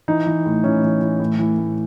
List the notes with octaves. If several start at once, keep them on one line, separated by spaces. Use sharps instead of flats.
E3 D#4
E3
A2
E3 C#4
E3
E3
A2
E3
A2